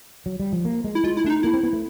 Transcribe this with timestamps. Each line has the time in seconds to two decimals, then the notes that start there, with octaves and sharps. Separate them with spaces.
0.26 F#3
0.40 G3
0.53 F3
0.65 A#3
0.84 G#3
0.95 E4
1.04 G#3 F4
1.17 E4
1.24 A3 D4
1.30 D#4
1.43 A#3 E4
1.54 C4
1.63 B3
1.73 A3